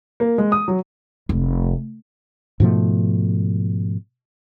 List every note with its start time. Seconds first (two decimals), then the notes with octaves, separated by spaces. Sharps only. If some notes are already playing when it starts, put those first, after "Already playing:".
0.20 A#3
0.38 G#3
0.52 D#6
0.68 F#3
1.29 F1
2.60 G#2 B2 F3 A3